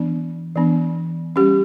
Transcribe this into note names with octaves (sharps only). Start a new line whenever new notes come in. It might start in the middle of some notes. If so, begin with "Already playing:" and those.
Already playing: E3 B3 D4
E3 B3 D4
G3 C#4 G4